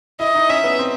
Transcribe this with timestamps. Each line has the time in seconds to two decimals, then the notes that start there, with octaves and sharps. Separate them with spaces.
0.20 E4 D#5
0.35 D#4
0.49 C#4 E5
0.64 B3
0.79 C4